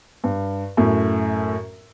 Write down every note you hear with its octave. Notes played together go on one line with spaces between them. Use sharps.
G2
F#2 A2